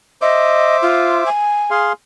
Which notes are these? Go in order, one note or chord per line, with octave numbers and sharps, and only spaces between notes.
C5 D#5 E5 D6
F4
G#5
G#4 F5 C6